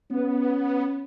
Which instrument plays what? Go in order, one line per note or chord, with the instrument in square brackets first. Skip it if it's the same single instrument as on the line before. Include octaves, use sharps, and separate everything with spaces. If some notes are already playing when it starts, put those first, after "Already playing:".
[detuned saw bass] B3 [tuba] C#4